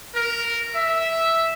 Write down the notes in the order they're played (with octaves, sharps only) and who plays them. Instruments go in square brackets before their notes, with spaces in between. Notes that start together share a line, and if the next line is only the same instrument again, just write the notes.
[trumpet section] A#4
E5